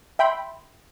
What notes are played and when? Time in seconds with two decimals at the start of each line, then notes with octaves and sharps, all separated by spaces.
0.19 E5 G5 B5 C6